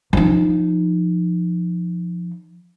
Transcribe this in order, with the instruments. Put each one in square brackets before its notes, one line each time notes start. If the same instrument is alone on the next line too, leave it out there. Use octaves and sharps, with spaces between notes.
[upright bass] F3 D#4